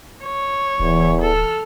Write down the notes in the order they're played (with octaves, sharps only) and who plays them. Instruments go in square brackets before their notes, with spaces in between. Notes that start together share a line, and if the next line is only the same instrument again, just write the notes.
[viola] C#5
[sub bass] D1 [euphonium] E2 [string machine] E3 E4
[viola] A4 [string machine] F6